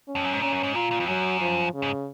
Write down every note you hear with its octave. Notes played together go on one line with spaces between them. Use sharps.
C#4
F2
F#2
G#2
A#2 C#4
F#2
G#2
A#2 F4
A#2
F2
F#2 F#3
F3
C#3
G#2